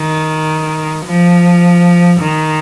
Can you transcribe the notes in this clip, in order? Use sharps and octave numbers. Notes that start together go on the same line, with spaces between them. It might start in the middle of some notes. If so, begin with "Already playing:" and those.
Already playing: D#3
F3
D#3